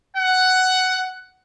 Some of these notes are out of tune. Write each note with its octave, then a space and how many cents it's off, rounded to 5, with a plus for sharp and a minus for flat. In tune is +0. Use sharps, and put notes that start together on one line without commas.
F#5 +10